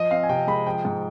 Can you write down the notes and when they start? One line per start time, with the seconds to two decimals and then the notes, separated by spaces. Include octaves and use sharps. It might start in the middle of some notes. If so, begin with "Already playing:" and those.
Already playing: F3 D#5
0.11 C4 F5
0.23 G#5
0.29 C3 G5
0.47 G#3 B5
0.66 F3 G5
0.85 G#2